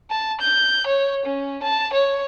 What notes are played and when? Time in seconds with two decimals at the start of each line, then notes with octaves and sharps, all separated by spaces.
0.11 A5
0.41 G6
0.87 C#5
1.26 C#4
1.63 A5
1.93 C#5